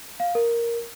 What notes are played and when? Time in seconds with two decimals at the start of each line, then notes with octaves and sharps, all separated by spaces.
0.20 F5
0.35 A#4